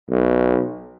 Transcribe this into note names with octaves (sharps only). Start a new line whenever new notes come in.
B1